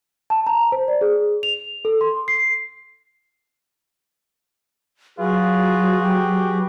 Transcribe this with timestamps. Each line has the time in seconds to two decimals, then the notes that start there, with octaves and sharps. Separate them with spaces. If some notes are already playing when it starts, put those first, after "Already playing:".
0.30 A5
0.47 A#5
0.72 C5
0.88 D5
1.01 G#4
1.43 F7
1.85 A4
2.01 C6
2.28 C7
5.19 F#3 F4 F#4 G#4 B4
6.03 G4